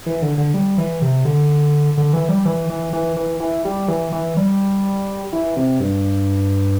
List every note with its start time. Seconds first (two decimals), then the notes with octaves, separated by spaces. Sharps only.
0.06 E3
0.22 D3
0.38 D3
0.54 G3
0.78 E3
1.02 C3
1.25 D3
1.98 D3
2.13 E3
2.29 G3
2.45 E3
2.70 E3
2.93 E3
3.16 E3
3.40 E3
3.65 G3
3.88 E3
4.12 E3
4.37 G3
5.33 E3
5.57 C3
5.80 G2